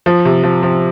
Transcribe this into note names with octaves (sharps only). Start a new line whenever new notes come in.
F3
C3
F3
F3